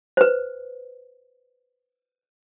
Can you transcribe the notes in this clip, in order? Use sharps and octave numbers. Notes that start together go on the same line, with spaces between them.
B4 C5